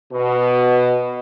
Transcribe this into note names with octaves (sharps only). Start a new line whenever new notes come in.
B2